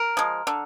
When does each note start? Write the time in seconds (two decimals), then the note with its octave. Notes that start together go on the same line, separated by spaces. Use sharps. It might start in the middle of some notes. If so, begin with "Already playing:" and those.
Already playing: A#4
0.17 F3 G#3
0.47 D3